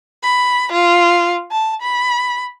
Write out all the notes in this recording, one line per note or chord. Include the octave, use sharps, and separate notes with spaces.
B5
F4
A5
B5